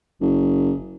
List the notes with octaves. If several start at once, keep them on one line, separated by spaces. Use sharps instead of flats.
F#1